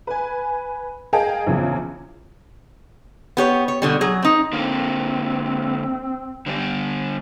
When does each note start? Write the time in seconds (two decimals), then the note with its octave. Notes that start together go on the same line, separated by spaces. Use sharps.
0.07 B4 G#5
1.13 G#4 A#4 D#5 F5 G5 A5
1.46 A#1 E2 C#3
3.37 B3 G4 C#5
3.68 C#5
3.82 B2 D3 G3
4.01 F#3 G#4
4.23 C4 D#4
4.53 D3 A#3 C4 F4
6.46 D3 G3 D4